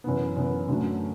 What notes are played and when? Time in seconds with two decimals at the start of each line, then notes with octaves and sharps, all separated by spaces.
0.04 F#2 E3 B3
0.37 F#2 E3 B3
0.68 F#2 D3 F#3 A3